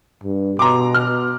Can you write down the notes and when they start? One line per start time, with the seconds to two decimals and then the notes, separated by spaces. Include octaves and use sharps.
0.24 G2
0.59 B2 A#5 C6 D6
0.94 F6